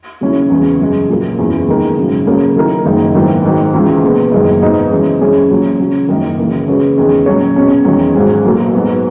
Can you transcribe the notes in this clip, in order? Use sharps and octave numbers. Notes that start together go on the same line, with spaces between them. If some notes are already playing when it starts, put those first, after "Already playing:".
D#2 C#3 F#3 C#4 E4
E2 C#3 E3 G#3
F#2 C#3 G#3
A#1 A#2 F#3 A#3
F#1 E2 C#3 E3
D#3 G#3 B3 D#4 A#4
G#1 F#2 C#3
C#3 F#3 A#3 C#4
D#3 F#3 A#3 E4 A#4
F#1 F#2 D#3 G#3 D#4
G#2 D#3 F#3 B3 E4
G#2 D#3 F#3
C#2 C#3 E3
A#2 G#3 B3
F#1 F#2 D#3 G#3 D#4
G#2 F#3 B3 D#4
C#3 E3 G#3 C#4 G#4
F#2 E3 G#3 C#4 G#4
A#1 A#2 F#3 C#4
C#3 F#3 C#4
F#1 F#2 D#3
C#3 E3 A#3 E4
C#3 G#3 C#4 F#4 B4
E2 D#3 G#3 C#4
A#2 F#3 C#4 F#4 C#5
B2 G#3 C#4
E2 D#3 F#3 C#4 G#4
G#1 G#2 F#3 C#4 G#4
B1 A#2 F#3 A#3
G#2 F#3 B3 F#4